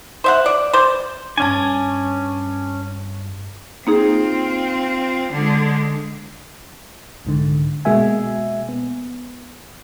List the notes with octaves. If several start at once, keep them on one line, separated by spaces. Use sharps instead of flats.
C5 E5 F#5
D5
C5 D5
G2 C#4 D4 G#5 A5 D6
A#3 C4 D#4 F4 G#4
D3 G#3
C2 G#2 D3
B2 G#3 A#3 F#4 E5 G#5
B3